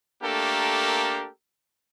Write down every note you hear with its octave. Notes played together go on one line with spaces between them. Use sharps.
A3 A#3 D4 G4 A4 A#4